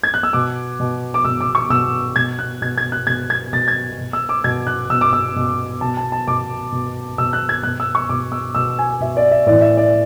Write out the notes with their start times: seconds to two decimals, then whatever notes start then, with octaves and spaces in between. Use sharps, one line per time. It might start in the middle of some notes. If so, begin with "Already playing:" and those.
0.03 G#6
0.14 F#6
0.23 E6
0.33 B2 D6
0.80 B2
1.14 D6
1.24 B2 E6
1.41 D6
1.55 C#6
1.70 B2 E6
2.16 B2 G#6
2.39 F#6
2.61 B2 G#6
2.78 G#6
2.92 F#6
3.07 B2 G#6
3.30 G#6
3.53 B2 A6
3.68 G#6
3.98 B2
4.13 E6
4.29 D6
4.44 B2 G#6
4.67 F#6
4.90 B2 E6
5.01 D6
5.13 E6
5.36 B2
5.81 B2 A5
5.97 A5
6.12 A5
6.28 B2 D6
6.72 B2
7.18 B2 E6
7.33 F#6
7.49 G#6
7.63 B2 F#6
7.80 E6
7.95 C#6
8.09 B2 D6
8.32 E6
8.55 B2 E6
8.79 G#5
9.00 B2 E5
9.17 D5
9.31 E5
9.46 A2 E3 D5
9.61 E5
9.77 D5